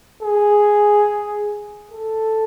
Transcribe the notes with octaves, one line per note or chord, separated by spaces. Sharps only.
G#4
A4